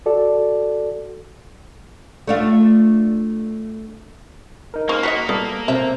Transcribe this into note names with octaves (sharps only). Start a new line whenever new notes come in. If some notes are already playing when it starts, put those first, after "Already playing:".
F#4 A4 D5
A3 D4 F4
D#4 A#4
C#3 A#3 C5 C#6 F6
F#4 C#5 D#5 B6 C#7
G3 B3 A4
C3 C4 C5 E5